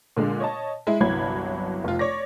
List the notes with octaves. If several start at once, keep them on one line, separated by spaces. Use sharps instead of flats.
A#2 D3 G#3
C#5 D#5 A5
G#3 E4
G1 C2 E3 F#3 B5 G#6
F1 F4
C#5 D5 D6 A#6